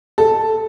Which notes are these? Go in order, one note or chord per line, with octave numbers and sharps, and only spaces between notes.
A4